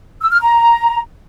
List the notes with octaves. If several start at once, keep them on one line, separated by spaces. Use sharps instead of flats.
E6
F6
A#5